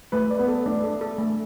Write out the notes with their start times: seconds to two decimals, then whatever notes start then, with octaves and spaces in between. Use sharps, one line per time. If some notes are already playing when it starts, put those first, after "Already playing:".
0.12 A3 B4
0.31 D5
0.39 B3
0.48 A4
0.66 A3 D4
0.84 A4
1.01 A4
1.18 A3